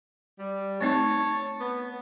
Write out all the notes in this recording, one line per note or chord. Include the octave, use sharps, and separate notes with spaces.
G3
A3 C4 D#4 C#5 A5
B3